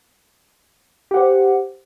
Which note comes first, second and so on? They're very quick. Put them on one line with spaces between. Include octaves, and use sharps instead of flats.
G4 F#5 C5